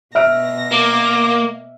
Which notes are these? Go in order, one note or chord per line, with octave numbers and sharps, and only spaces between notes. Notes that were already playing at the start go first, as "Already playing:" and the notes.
B2 E5 F6 A#6 D7
A#3 D6